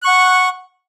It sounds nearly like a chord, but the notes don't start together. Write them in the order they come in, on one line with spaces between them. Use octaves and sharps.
F#6 C#6 F#5